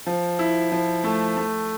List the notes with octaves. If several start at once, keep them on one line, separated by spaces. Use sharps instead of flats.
F3
E4
F3
A3
A3